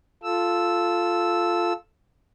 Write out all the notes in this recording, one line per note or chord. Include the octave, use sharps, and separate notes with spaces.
F4 A4 E6